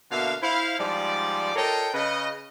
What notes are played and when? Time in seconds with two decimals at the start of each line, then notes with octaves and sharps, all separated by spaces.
0.11 B2 D3 A#3 E5 F5
0.42 E4 C5 F5
0.79 G#2 F3 G3 D5
1.55 F4 A4 A#4 C#5 D#5 G5
1.93 C#3 B4 D#5